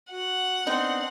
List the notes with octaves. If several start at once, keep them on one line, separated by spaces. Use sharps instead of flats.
F#4 F#5
B3 C4 D4 D#4